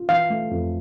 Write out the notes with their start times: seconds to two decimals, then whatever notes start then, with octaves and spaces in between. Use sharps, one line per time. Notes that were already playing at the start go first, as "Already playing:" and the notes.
Already playing: F4
0.09 E3 F5
0.30 A3
0.51 F2